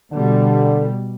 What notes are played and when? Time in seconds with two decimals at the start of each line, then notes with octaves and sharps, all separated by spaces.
0.12 B2 D3 G3